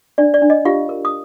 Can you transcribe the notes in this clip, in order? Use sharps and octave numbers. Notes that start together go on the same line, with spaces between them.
D4 D5
D5
D4
D#5
F4 G4 F5
A#4
D#6